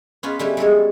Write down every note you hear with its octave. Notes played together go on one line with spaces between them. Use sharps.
B3 C#4 F4 B4
D3 G3 A3 C#4 E4 G4
G3 G#3 A4 C#5